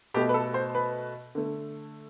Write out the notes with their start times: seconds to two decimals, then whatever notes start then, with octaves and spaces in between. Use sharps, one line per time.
0.14 B2 A3 G4
0.29 B4
0.34 A4
0.54 C5
0.75 B4
1.35 D3 A3